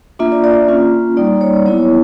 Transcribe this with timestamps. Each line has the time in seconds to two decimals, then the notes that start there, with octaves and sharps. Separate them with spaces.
0.19 A#3 D4 F4 E5
0.32 D5
0.44 D5
0.68 A#3 C#4 F4
1.17 G3 A#3 D#4 D5
1.41 C#5
1.66 F#3 B3 E4 C#5